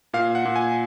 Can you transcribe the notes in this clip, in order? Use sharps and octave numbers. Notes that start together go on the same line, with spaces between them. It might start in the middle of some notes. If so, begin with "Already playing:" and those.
A#2 F5
F#5
A#2
G#5